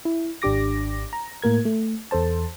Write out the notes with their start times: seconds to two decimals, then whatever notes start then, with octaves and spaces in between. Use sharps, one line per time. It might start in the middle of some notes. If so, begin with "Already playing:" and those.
0.05 E4
0.42 G#1 D4 G4 D6 A#6
1.13 A#5
1.42 A2 A#3 A#4 G#6
1.65 A3
2.11 E2 A4 C5 A5